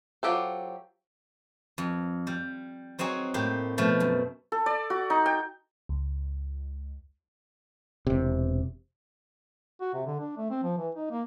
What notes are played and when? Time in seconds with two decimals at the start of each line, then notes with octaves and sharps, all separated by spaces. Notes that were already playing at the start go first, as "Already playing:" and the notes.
0.23 F#3 F4 G4 A4 C5
1.78 F2
2.27 G3
2.99 F#3 C4 D#4 F#4 G#4
3.34 A2 A#3 G4
3.78 B2 F3 A3
4.00 F#2
4.52 A4
4.66 D5
4.90 F#4
5.10 D#4
5.26 G5
5.89 C#2
8.07 E1 C3
9.81 F#4
9.94 C3
10.06 D3
10.20 D4
10.38 A3
10.50 C4
10.63 F3
10.78 E3
10.95 D#4
11.10 A#3